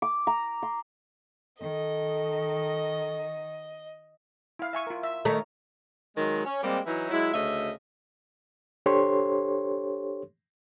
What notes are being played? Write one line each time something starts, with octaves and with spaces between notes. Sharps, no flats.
D6
A#5
C6
D#3 A4 D#5
E4 F5
E5 G#5 C#6
F4 A#4
E5
D#3 A3 C#5 A#5
D#3 F#3 G#3
C#4
G3 G#3 A#3 C4 G4
E3 F#3 D#4 E4
F#3 G#3 E4
D2 C#3 A3 D#5 E5
D4 G4 A4 C5 C#5 C6